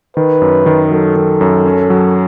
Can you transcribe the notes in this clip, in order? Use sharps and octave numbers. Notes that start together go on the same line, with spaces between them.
D#3 B4
F#2
D#3
F#3 A4
D#3
F#2
C#4
F#3